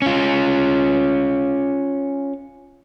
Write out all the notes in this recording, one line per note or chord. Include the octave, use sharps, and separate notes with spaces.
C#4 F4